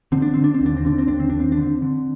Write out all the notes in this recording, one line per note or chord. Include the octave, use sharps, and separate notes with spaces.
D3 C4
D4
D3 C4
D4
C4
D#2
D4
C4
D3 D4
C4
D#2 D4
C4
D#2 D4
C4
D4
D3
C4
D3